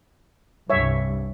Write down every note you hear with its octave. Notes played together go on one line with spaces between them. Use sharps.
C2 G2 C#5 E5